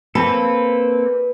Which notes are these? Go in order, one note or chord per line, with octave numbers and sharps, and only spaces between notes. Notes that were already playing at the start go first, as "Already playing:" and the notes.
A#3 C4 A4 B4